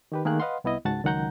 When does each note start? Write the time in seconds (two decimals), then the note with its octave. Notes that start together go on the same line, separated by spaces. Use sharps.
0.12 D#3 G4 B4
0.25 D#3 A3 A#3 G#4 A#4 F#6
0.40 B4 D#5 F5 F#5 C6
0.64 C2 B3 E4 D#5
0.85 C#2 G#2 F#4 F#5 A5 A6
1.04 C#2 D#3 F#3 F#5 A#5 G6